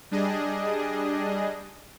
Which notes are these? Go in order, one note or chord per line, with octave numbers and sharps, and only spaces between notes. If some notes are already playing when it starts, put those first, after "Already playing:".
G3 D4 G#4 D#5